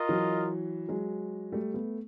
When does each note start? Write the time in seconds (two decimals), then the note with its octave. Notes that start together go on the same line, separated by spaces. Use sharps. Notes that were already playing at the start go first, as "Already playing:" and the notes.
Already playing: F4 A#4 D#5
0.09 E3 F#3
0.89 F#3 G#3
1.52 G3 A3
1.74 A3 B3